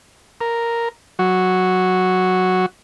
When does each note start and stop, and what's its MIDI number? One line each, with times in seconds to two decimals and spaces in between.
0.41 0.89 70
1.19 2.66 54
1.19 2.66 66